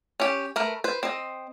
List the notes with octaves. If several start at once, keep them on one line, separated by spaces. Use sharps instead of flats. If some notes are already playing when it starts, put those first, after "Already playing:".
C#4 G4
A3 A#4 B4
B4 C5
C4 D#5